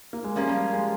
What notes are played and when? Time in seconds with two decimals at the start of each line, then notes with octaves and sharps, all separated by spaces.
0.13 A#3
0.24 G#3
0.36 F3 G3 A#3 C#4 F4
0.73 G#3